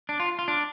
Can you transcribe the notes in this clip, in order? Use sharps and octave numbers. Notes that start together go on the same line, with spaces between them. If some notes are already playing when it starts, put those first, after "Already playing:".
D4
F4
F4
D4